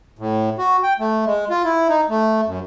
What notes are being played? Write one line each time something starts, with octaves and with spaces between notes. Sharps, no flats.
A2
F#4
G5
A3
G#3
F4
E4
D#4
A3
F#2